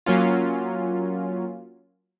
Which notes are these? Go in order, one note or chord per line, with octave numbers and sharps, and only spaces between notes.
F#3 A#3 C#4 F4